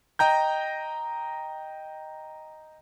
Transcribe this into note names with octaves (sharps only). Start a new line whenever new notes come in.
D#5 G5 A#5 G6